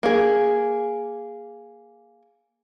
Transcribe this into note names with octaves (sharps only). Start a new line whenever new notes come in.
A#3 G#4